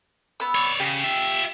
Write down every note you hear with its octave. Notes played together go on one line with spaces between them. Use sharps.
B3 E6
C#5 D5
C#3 G4
F4 E5